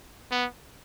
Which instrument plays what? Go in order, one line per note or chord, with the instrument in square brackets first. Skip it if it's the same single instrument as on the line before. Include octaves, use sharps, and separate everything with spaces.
[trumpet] B3